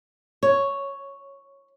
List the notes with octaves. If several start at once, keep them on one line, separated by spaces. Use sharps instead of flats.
C#5